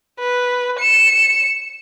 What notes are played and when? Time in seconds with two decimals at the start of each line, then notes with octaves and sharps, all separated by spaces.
0.19 B4
0.80 C#7 E7